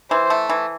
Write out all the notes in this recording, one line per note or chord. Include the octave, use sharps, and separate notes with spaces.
E3 C5
A3
E3